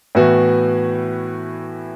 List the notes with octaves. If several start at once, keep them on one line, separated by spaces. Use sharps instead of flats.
A2 E3 B3 F#4